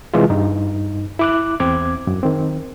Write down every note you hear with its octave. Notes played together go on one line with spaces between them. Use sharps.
C3 E3 G#3 E4 F4
G2 D#4
E4 D6 F#6
E2 C4 D6 G#6
F#2
D#3 C4